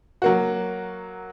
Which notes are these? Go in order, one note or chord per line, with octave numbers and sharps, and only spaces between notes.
F#3 A#3 F#4